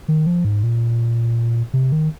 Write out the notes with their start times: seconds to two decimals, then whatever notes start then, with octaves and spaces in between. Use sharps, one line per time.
0.08 D#3
0.26 F3
0.45 G#2
0.63 A#2
1.74 C3
1.92 D#3